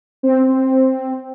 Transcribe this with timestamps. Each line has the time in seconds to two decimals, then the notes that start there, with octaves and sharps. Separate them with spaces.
0.23 C4